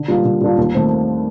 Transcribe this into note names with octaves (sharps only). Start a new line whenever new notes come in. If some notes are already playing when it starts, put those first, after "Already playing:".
Already playing: D3
G3 A#3 D4 F4
D3
G3 A#3 D4 F4
D#2
D#3 A3 C4